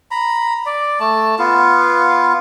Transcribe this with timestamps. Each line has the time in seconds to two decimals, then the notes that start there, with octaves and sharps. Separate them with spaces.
0.11 A#5 B5
0.66 D5
1.00 A3 A5
1.39 B3 F4